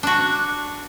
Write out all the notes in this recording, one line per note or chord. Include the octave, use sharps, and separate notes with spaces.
D4 F#4